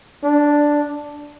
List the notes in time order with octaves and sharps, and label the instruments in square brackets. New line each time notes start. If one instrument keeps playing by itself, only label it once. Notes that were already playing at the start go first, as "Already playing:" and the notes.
[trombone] D4